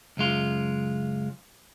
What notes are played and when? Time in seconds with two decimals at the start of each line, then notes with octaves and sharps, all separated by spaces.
0.17 C#2 F#2 G#3 F4